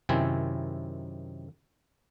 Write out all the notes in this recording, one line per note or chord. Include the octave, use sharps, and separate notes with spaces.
F#2 C3 D#3 C4 E4 G#5